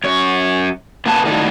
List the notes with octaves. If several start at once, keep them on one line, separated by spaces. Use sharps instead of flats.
F#2 C#5
B2 A#3 B3 G#4 B4 A5
A2 D3 D#3 F#3 G3 D#4